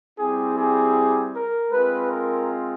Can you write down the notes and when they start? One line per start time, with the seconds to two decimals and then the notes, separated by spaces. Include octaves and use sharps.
0.17 G3 C4 E4 G4 G#4
0.57 G#4
1.33 A#4
1.71 G#3 C4 F4 B4
2.10 A#4